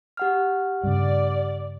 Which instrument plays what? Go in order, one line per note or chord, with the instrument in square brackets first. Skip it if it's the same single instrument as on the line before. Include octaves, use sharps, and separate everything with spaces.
[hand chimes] G4 F#5 F6
[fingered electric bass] G2 C#3 [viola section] D5